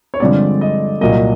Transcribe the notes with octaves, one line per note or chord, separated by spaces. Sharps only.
C#5
G2 D3 F3 G#3 C4 D5
D#5
C2 A#2 F#3 A#3 D#5